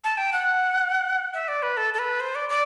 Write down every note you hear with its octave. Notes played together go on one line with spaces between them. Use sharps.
A5
G5
F#5
E5
D5
B4
A4
A4
B4
C5
D5
D5